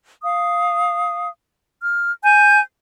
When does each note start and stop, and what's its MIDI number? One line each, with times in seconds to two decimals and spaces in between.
0.22 1.29 77
0.22 1.29 87
1.82 2.11 89
2.24 2.60 80
2.24 2.60 91